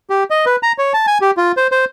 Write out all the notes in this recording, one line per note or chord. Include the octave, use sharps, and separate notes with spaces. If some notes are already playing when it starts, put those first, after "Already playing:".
G4
D#5
B4
A#5
C#5
A5
G#5
G4
F4
C5
C5